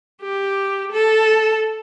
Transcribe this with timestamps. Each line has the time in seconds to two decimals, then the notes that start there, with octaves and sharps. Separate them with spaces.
0.22 G4
0.92 A4